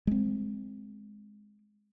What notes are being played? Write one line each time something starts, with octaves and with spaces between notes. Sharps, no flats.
G#3 C4